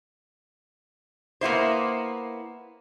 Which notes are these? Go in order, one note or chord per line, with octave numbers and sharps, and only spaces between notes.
A#3 B3 E4 C5